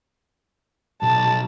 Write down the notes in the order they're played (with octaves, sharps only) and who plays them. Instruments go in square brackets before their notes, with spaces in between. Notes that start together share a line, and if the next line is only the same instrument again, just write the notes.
[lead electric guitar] B1 [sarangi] A5